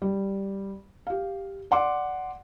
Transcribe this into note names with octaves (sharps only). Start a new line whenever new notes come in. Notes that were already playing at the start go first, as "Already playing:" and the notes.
G3
G4 F5
D5 F#5 C6 D6